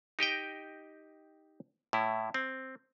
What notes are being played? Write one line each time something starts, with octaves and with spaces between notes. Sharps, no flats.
D#4 G4 D#5 G5
A2 E4
C4